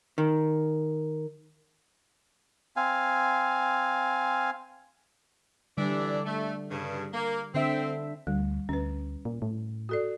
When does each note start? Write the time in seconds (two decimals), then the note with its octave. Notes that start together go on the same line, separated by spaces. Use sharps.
0.18 D#3
2.76 C4 F5 G#5
5.77 D3 E3 G3 D4 D5
6.25 A3
6.70 G2 C#3
7.13 A#3
7.54 D3 C4 E5
8.27 D2 G3
8.69 D2 C#4 B4
9.25 A#2
9.42 A2
9.89 F#4 A4 D5